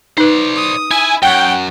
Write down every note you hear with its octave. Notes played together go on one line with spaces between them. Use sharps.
D#4 B4 C5 D5
D#6
E4 G#5
F#2 C#5 F#5 G5